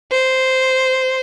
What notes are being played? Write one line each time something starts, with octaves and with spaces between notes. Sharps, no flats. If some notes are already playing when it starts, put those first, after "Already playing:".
C5